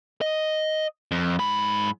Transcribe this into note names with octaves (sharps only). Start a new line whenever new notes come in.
D#5
F2
G#2 B5